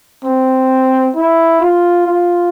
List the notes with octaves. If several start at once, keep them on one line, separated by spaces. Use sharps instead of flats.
C4
E4
F4
F4